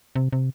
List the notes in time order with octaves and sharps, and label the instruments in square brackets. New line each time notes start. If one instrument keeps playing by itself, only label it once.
[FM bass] C3
C3